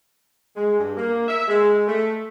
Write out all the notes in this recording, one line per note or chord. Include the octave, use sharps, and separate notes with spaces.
G#3
G2
A#3
E5
G#3
A3